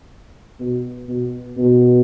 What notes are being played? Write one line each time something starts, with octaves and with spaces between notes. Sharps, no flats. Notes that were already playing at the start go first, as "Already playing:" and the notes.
B2
B2
B2